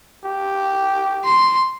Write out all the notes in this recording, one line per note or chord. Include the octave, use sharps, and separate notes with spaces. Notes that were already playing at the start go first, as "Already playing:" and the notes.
G4
C6